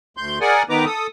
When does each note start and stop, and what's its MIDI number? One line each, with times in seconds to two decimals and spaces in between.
0.17 0.39 38
0.17 0.39 84
0.17 0.39 91
0.41 0.63 68
0.41 0.63 70
0.41 0.63 74
0.41 0.63 78
0.41 0.63 80
0.69 0.85 51
0.69 0.85 59
0.69 0.85 63
0.69 0.85 71
0.69 0.85 82
0.69 0.85 86
0.85 1.07 69
0.85 1.07 87